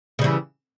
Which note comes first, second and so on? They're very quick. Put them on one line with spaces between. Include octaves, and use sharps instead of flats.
C#3 G3 E3